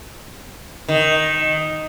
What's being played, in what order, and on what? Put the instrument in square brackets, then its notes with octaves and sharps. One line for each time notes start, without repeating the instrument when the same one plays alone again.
[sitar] D#3